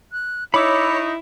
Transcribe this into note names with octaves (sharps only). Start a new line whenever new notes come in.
F#6
D#4 E4 C#5 B5 D6 E6